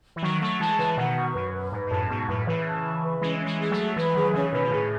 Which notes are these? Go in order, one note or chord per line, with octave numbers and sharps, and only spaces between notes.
E3
D#3 F#3 C#6
F#3 A3 C#6
E3 G#3 A5
C#3 E3 B4
B2 D#3 F#5
C#6
F#2 B4
B4
G#2 B4
G#2
F#2 A2 A5
G#2 B2 C#6
F#2 A2 B4
C#3 E3 B4
A5
C#6
B4
E3 G#3 C#4
C#4
E3 G#3
G#3 G#4
F#3 A3
E5
E3 G#3 B4
G#3
D#3 F#3 G#4
C#3 E3 C#4
B2 D#3 B4
D#3
A2 C#3 G#4